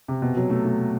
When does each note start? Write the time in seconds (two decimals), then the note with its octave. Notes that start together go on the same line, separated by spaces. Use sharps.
0.08 C3
0.22 B2
0.37 F#3
0.50 A3
0.65 A3